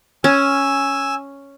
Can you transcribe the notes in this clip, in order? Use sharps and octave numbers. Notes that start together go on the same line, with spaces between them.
C#4 G#5 E6